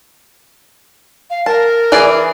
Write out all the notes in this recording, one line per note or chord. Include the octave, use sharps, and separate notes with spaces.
F5
A#4 A5
E3 G#4 D5